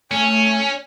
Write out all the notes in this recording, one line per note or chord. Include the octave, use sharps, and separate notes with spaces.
A3 C#4 G#5